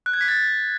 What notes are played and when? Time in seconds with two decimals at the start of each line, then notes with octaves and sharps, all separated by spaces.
0.06 F#6
0.13 G#6
0.21 B6
0.28 A6